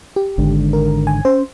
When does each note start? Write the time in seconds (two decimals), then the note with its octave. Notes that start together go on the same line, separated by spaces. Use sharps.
0.16 G4
0.38 G#1 G#2 D3
0.73 A#4
1.07 G#5
1.25 C#4 C5